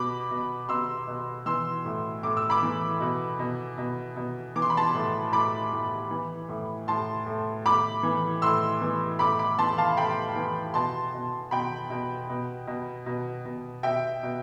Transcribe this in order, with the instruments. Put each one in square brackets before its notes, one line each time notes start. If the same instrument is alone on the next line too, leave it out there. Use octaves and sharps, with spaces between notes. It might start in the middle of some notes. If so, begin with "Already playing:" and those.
Already playing: [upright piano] B2 B5 D6
B2
B2 C6 E6
B2
E3 C6 E6
A2
A2 D6
E6
B5 D6
E3
B2
B2
B2
B2
E3 D6
C6
B5
A5 C6
A2
A2 B5 D6
A2
E3
A2
A2 A5 C6
A2
A2 B5 D6
E3
A2 C6 E6
E3
A2 B5 D6
B5 D6
E3 A5 C6
F5 A5
A2 G5 B5
E3
B2 A5 C6
B2
B2 G5 B5
B2
B2
B2
B2
B2
B2 E5 G5
B2